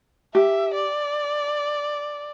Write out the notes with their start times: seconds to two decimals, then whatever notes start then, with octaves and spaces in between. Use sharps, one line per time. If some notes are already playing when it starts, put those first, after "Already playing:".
0.35 G4 E5
0.75 D5